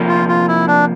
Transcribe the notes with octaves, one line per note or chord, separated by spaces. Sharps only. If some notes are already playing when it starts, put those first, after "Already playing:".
Already playing: C3 F3 A#3
F4
F4
E4
D4